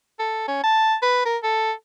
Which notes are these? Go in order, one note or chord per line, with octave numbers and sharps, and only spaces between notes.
A4
C#4
A5
B4
A#4
A4